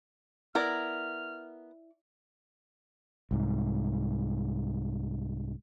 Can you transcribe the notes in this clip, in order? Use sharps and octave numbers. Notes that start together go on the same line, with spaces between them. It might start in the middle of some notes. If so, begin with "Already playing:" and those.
B3 E4 A#4 D5 F6
C2 G#2